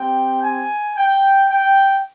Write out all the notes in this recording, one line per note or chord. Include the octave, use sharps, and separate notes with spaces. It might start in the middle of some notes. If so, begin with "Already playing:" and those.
Already playing: C4 G4 G5
G#5
G5
G5